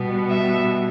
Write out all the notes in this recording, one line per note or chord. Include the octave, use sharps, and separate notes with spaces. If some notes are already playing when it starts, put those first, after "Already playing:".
Already playing: B2 G3 B3
E5